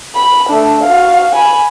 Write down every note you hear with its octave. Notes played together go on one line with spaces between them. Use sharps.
B5
A3 D4
F#4 F5
G#5 B5